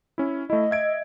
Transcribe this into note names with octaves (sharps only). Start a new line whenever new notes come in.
C#4 E4
A3 E4 D#5
E5 G#6 D7